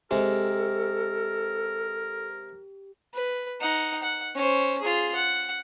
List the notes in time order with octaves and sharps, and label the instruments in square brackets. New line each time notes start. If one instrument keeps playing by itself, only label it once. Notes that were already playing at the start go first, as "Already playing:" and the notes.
[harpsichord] C3 G#3 [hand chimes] G4 [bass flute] A4 [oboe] A#4
[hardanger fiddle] B4
D#4 F#5
F#5
C#4 C5
F4 G#4
F#5